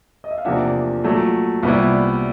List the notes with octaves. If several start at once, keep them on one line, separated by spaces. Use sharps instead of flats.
D#5
E5
F5
E2 C3 F3 A#3 D4 E5 F#5
A#2 F#3 A3
C2 A#2 G3 B3 E4